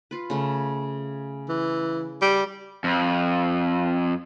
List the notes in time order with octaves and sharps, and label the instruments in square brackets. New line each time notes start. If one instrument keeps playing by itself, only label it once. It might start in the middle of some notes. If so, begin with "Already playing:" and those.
[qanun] F4 B4
C#3 A3
[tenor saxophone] E3
G3
[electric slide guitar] F2